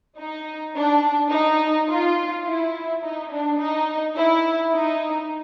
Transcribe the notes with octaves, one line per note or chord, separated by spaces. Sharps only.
D#4
D4
D#4
F4
E4
D#4
D4
D#4
E4
D#4